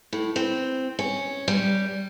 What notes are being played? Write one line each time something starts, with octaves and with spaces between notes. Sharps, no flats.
A2
C4
C#4
G3